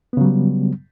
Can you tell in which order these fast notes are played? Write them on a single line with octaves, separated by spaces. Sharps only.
B3 C#3 F#3 G3